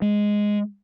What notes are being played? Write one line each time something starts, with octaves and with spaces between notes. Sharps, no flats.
G#3